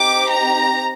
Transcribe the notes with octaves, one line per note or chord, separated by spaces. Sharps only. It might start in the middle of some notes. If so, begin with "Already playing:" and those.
Already playing: C4 D#4 G4 D6
A#5